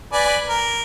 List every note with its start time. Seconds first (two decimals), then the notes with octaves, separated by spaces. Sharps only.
0.13 B4 D5 G#5
0.48 A#4